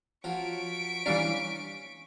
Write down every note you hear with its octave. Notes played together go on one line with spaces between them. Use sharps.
F3 F#3 C#6 B6 D7
E3 G3 C#4 D4 F5 A#5